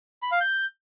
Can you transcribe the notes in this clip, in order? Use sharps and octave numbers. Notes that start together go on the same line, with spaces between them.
B5
F5
G6